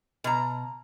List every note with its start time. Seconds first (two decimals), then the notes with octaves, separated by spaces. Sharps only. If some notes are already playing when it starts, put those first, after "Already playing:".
0.24 B2 A#5